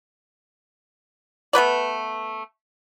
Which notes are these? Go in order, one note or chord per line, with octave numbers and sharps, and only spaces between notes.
A3 B3 B4 D5